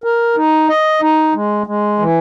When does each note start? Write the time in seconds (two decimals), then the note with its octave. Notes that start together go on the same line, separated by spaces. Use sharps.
0.04 A#4
0.36 D#4
0.69 D#5
1.02 D#4
1.34 G#3
1.67 G#3
1.99 E3